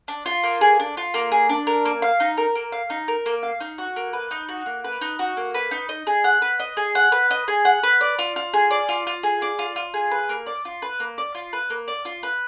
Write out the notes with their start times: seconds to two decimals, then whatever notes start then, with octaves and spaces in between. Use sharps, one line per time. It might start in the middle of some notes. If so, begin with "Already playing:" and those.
0.08 D4
0.26 F4
0.44 A#3
0.61 G#4
0.79 D4
0.97 F4
1.14 A#3
1.32 G#4
1.49 D4
1.67 A#4
1.85 A#3
2.02 F5
2.20 D#4
2.37 A#4
2.55 A#3
2.72 F5
2.90 D#4
3.08 A#4
3.26 A#3
3.43 F5
3.61 D#4
3.78 F#4
3.96 A#3
4.13 B4
4.31 D#4
4.49 F#4
4.66 A#3
4.84 B4
5.01 D#4
5.19 F#4
5.37 A#3
5.54 B4
5.71 D#4
5.89 D#5
6.07 G#4
6.24 F#5
6.42 B4
6.60 D#5
6.77 G#4
6.95 F#5
7.12 B4
7.31 D#5
7.48 G#4
7.65 F#5
7.83 B4
8.01 D5
8.19 F4
8.36 F4
8.54 G#4
8.71 D5
8.89 F4
9.07 F4
9.23 G#4
9.42 D5
9.59 F4
9.76 F4
9.94 G#4
10.11 B4
10.29 A#3
10.46 D5
10.65 F4
10.82 B4
11.00 A#3
11.18 D5
11.35 F4
11.53 B4
11.70 A#3
11.88 D5
12.05 F4
12.23 B4